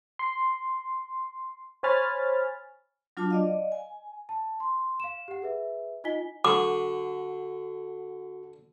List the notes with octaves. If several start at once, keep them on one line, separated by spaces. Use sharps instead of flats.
C6
C5 C#5 G#5 B5 F6 A6
F#3 D4 F4 F#4 A5 D6
D5 D#5 F5
G#5
A5
C6
F5 E7
G4 F#5
G#4 B4 E5
D#4 F4 D#5 G#5 B6 G7
D3 F#4 D6